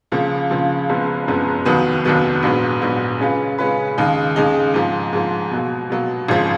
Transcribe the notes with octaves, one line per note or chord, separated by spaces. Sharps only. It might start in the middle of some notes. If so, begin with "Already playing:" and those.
C#2 C#3 F3 A#3
C#2 C#3 F3 A#3
F#1 F#2 F3 G#3 B3
F#1 F#2 F3 G#3 B3
F1 D#2 D#3 F#3 B3
F1 D#2 D#3 F#3 B3
A#1 G#2 F#3 B3
A#1 G#2 F#3 B3
C#3 G#3 C#4 F4 B4
C#3 G#3 C#4 F4 B4
D#2 C#3 G#3 D#4
D#2 C#3 G#3 D#4
G#2 F3 A#3
G#2 F3 A#3
B2 F#3 A#3
B2 F#3 A#3
G#1 F#2 C#3 F3 G#3